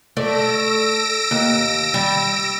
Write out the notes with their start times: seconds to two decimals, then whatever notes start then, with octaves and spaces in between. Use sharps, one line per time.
0.17 A3 D5 E6 A#6 D7
1.31 D#2
1.94 G3